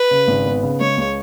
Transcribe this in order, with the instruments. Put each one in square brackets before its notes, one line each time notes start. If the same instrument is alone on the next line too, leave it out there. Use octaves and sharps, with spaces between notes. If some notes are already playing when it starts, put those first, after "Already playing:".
Already playing: [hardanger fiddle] B4
[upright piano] C#3
G#1
B3
C#3
[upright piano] G#3 [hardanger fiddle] C#5
[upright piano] C#2